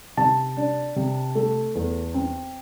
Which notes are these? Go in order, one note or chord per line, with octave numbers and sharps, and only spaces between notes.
C3 A5
D4
C3
A3
E2
C4